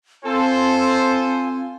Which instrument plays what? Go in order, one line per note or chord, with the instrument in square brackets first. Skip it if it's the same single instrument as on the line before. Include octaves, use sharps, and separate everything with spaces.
[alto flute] C4 [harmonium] F4 G#5 [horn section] A4 [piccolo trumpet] C5